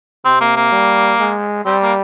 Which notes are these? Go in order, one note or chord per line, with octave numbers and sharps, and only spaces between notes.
C3 C4
A#3
A#3
G3
G#3
G3 C4
A#3